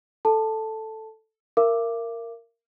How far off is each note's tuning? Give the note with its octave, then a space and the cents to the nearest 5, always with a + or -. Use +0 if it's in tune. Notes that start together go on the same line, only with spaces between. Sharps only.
A4 +0 A5 +0
A#4 -10 E5 +45 D6 +0